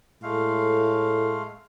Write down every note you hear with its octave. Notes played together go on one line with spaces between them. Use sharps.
A2 G#3 A3 F5